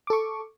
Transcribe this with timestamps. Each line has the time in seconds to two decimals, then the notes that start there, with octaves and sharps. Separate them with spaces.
0.07 D6
0.10 A4
0.13 C#6